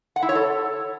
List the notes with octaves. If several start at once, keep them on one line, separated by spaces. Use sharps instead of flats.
F#5
E4
C#5
A4